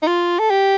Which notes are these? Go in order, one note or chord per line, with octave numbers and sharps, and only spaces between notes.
D#4
F4
A4
G4